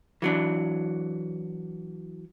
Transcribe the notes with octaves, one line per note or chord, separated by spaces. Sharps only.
E3 F#3 D4